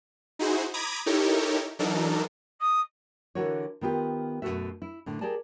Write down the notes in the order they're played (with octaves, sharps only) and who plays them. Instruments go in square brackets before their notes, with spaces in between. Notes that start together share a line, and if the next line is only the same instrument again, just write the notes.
[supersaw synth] D#4 E4 F#4 G#4 C5
A#5 B5 D6 D#6 G#6
D#4 E4 G4 A4 A#4 C#5
E3 F#3 D4 D#4 A4 A#4
[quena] D#6
[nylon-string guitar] D3 E3 E4 F#4 A#4 C#5
D#3 B3 F4 G4
F#2 B2 F#3 A3 F#4 E5
E4
A2 D3
G4 G#4 A#4 D5 A5